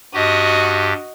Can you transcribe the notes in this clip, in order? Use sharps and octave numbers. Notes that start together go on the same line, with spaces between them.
G2 F#4 G4 D#5